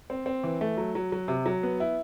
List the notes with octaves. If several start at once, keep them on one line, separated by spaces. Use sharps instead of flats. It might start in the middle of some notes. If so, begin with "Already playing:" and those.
C4
C4
E3
A3
F#3
F#3
F#3
C3
F#3
B3
E4